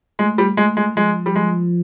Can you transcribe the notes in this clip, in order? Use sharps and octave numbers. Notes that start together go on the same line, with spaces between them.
G#3 A3
G3
G#3 A3
G#3
F3 G#3
G3
G#3